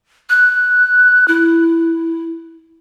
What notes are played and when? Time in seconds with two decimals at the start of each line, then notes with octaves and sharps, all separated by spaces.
0.30 F#6
1.28 E4